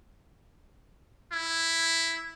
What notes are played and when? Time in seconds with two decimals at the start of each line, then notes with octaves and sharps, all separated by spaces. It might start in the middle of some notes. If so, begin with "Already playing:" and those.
1.32 E4